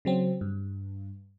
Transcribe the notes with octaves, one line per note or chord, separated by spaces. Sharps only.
C#3 F#3 C4
G2